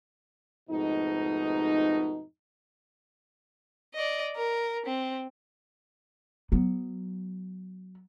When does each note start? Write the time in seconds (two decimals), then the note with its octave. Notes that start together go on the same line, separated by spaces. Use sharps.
0.70 F2 G#2 B2 A3 D#4
3.94 D5 D#5
4.36 A#4
4.86 C4
6.52 F#3 B3